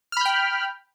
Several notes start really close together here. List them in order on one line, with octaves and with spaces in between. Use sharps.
F6 B5 G6 G5